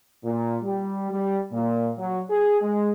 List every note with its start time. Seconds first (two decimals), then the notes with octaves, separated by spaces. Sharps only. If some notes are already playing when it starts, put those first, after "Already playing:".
0.24 A#2
0.63 G3
1.11 G3
1.52 A#2
1.98 F#3
2.30 G#4
2.62 G#3